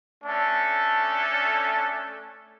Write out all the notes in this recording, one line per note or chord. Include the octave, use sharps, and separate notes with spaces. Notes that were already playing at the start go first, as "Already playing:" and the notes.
A3 C#4 D4 A4